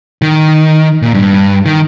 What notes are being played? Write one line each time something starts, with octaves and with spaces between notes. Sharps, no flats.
D#3
A#2
G2
D#3